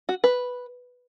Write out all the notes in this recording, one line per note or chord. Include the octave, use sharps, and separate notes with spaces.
F#4
B4